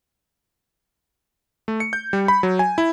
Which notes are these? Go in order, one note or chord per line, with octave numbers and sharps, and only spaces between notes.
A3
C#7
G6
G3
B5
F#3
G#5
E4